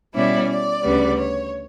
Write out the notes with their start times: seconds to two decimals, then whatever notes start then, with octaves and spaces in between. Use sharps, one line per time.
0.14 B2 G3 C#4 E4 D5
0.49 D5
0.83 D2 C#3 G3 B3
1.17 C#5